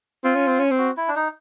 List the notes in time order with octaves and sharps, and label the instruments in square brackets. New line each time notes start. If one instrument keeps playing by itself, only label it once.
[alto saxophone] C4 [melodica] F4
[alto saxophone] C#4
C4
C#4
C4
[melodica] F#4
E4
D4
D#4